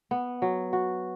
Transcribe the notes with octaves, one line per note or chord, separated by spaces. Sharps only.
B3
F#3
F#4